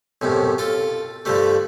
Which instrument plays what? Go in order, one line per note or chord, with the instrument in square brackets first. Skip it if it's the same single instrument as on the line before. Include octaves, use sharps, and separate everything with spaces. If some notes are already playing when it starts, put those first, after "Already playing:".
[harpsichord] B1 F#2 A2 C3
F4 A4
G2 D3 F3 G3 A3